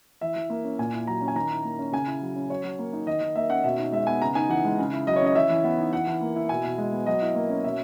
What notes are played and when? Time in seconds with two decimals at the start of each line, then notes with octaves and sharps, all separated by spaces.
0.21 E3 E5
0.36 E3
0.50 A#3
0.64 C#4
0.79 A#2 G#5
0.93 E4
1.07 F#3 A#5
1.21 C#4
1.28 G#5
1.35 D#3 A#5
1.50 E4
1.64 A#3
1.79 C#4
1.92 C#3 G#5
2.07 E4
2.22 F#3
2.36 C#4
2.50 F#3 C#5
2.64 F#3
2.79 A#3
2.93 D#4
3.07 D#3 D#5
3.21 D#3
3.36 A#3 E5
3.49 C#4 F#5
3.64 B2 E5
3.78 D#4
3.92 G#3 E5
4.07 B3 G#5
4.22 C#3 A#5
4.35 D#4 G#5
4.49 E3 F#5
4.65 G#3
4.78 C#3
4.93 E4
5.07 F#3 D#5
5.16 C#5
5.22 C#4 D#5
5.35 E3 E5
5.50 E3
5.64 B3
5.78 D#4
5.93 E3 F#5
6.07 E3
6.21 A#3
6.36 E4
6.49 B2 G#5
6.64 B2
6.78 G#3
6.93 B3
7.06 F#3 D#5
7.21 E4
7.35 A#3
7.50 C#4
7.64 B2 E5